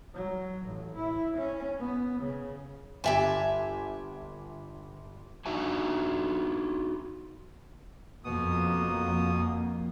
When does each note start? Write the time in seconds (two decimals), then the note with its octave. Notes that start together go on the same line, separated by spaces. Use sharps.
0.14 F#3
0.66 A1
0.95 E4
1.37 C#4
1.79 B3
2.21 C#3
3.04 G1 G4 E5 G#5 A5
5.46 D4 D#4 F#4 E5 G#5
8.24 F2 B2 A#3 B3 D#6